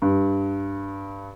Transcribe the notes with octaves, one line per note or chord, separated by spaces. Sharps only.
G2